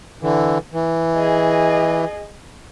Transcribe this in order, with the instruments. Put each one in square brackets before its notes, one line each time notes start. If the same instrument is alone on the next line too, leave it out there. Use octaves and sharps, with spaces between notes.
[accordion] D3 E3
E3
[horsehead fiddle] G#4 D#5